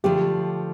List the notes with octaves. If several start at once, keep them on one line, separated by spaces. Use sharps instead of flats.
D3 F3 A3 G4 G5